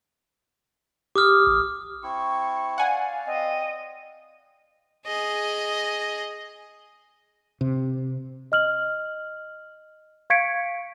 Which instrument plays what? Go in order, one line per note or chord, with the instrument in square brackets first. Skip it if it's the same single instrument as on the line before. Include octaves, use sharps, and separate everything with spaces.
[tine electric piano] G4 [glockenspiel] D6 D#6 F6
[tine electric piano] A1
[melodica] C4 E4 [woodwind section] C#6
[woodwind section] D5 F5 [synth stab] F#5 G#5
[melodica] C4 [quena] D#5
[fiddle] G#4 D#5
[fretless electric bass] C3
[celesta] D#5 F6 F#7
F5 C#6 G#6 B6 C#7 D7